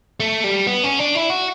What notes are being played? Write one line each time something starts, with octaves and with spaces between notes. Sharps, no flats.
A3
G3
B3
C#4
D4
E4
F#4